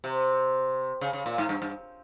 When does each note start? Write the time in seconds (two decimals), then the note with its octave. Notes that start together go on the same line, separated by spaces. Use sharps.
0.04 C3
1.01 C#3
1.13 C#3
1.26 A#2
1.38 G#2
1.49 G2
1.62 G2